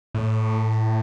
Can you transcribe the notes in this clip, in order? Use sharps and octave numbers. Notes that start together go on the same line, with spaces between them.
A2